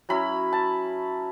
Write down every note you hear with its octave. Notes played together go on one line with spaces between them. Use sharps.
F#3 C#4 E4 B5
A5